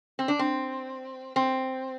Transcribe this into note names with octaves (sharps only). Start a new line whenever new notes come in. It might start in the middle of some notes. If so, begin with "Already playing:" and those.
C4
D4
C4
C4